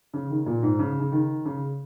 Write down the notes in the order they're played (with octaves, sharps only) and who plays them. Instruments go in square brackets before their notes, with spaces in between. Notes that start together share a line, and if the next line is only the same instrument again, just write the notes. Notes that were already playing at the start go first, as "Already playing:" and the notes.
[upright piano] C#3
D#3
A#2
G#2
C#3
C#3
D#3
C#3